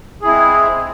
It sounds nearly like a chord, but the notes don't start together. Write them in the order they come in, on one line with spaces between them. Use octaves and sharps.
G#4 E4 C4 G#3